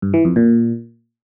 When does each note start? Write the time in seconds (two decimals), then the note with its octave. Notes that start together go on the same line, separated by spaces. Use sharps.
0.02 G2
0.14 E3
0.25 F2
0.36 A#2